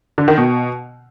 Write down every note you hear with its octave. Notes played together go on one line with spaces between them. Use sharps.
D3
D#3
B2